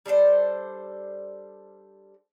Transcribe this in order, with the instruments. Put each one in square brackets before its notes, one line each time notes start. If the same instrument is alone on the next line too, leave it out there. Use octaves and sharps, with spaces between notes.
[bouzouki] G3 D4 A4 C5